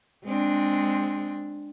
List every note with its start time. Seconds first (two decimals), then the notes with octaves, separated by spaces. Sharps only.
0.25 G#3 C4 D4